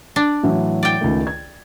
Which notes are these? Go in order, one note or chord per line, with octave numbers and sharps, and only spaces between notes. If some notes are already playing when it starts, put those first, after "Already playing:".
D4
A2 E3 F#3
D5 G5
C#2 D#3 A3
G#6